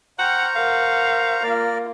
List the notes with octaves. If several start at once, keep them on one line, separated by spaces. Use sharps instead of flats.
C5 F#5 G5 A#5 C#6 F6
A#4 F5 F#5
A#3 F4 A#4 D5